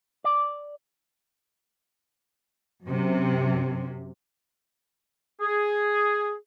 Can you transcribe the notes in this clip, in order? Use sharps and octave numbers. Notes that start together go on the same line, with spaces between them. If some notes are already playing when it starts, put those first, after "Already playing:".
D5
F#2 C3
G#4